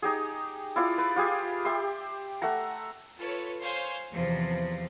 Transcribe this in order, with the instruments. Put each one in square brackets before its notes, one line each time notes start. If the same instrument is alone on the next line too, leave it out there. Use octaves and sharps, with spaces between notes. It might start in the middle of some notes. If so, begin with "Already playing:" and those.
[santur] D#4 G4 G#4
E4 F4 D5
B4
F4 G4 G#4
G4 E5 C6
A3 E5 F#5 A#5
[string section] F4 A4 B4 C#5
C5 C#5 F5 G#5 C6
E2 C3 E3 F3